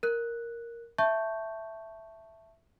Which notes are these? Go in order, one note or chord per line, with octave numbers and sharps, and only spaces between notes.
A#4 F#6
E5 A5 C#6 G6